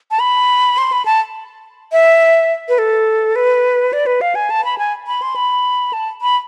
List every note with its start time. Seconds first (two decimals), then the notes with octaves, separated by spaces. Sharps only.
0.11 A5
0.20 B5
0.78 C6
0.92 B5
1.06 A5
1.92 E5
2.69 B4
2.78 A4
3.36 B4
3.93 D5
4.06 B4
4.21 F5
4.35 G#5
4.50 A5
4.65 B5
4.78 G#5
5.07 B5
5.22 C6
5.36 B5
5.93 A5
6.22 B5